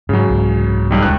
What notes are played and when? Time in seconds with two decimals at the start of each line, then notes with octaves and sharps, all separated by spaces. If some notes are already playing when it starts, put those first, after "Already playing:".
0.09 G#2 C#3 F#3
0.29 C2 G#2
0.91 B1 G3
1.02 D#1 C#2 F#6